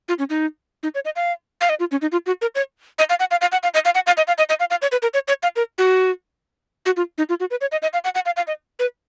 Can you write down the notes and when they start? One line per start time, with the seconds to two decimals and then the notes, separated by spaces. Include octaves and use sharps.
0.08 F4
0.19 C#4
0.30 D#4
0.83 D#4
0.95 C#5
1.05 D#5
1.16 F5
1.61 F5
1.69 D#5
1.80 F4
1.91 C#4
2.02 D#4
2.12 F4
2.26 F#4
2.42 A#4
2.55 C#5
2.99 D#5
3.10 F5
3.20 F#5
3.31 F5
3.41 F5
3.52 F#5
3.63 F5
3.74 D#5
3.85 F5
3.95 F#5
4.07 F5
4.17 D#5
4.28 F5
4.38 D#5
4.49 D#5
4.60 F5
4.70 F5
4.82 C#5
4.92 B4
5.02 A#4
5.14 C#5
5.28 C#5
5.43 F5
5.56 A#4
5.78 F#4
6.86 F#4
6.97 F4
7.18 D#4
7.29 F4
7.40 F#4
7.51 B4
7.61 C#5
7.72 D#5
7.82 D#5
7.93 F5
8.04 F#5
8.15 F#5
8.26 F5
8.37 F5
8.47 D#5
8.79 B4